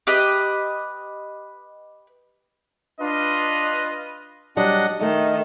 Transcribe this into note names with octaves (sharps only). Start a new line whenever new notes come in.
G4 B4 D#5
D4 F4 B4 D#5
F#3 G3 D4 D#5 F#5
D#3 A3 D#5